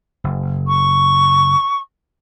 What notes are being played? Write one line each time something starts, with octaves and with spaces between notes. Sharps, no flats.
F#1
C#6